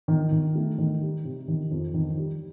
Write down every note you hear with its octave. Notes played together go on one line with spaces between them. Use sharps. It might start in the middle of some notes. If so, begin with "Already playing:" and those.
D#3
D#3
A3
D#3
G3
C3
D#3
F2
D#3
G3